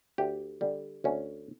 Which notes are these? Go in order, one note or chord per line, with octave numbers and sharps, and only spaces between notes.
D2 G4
D3 G3
D2 C#4